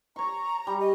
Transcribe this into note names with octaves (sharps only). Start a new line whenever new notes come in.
C#5 A#5 C#6
G3
D#5